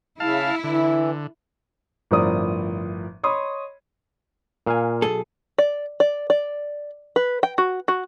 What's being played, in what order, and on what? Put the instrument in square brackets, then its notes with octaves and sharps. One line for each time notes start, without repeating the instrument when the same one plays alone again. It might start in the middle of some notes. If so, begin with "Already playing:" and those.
[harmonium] C#3 [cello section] E4 [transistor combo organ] F5 A5
[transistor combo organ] D3 [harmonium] E3
[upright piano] G1 A2 F3 A#4 D5 D#6
C#5 D#5 B5 C6 D#6
[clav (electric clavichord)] A#2 F5 G#5
[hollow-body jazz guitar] B1 G#4 A4
[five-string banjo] D5
D5
D5
B4
G5
F#4
F#4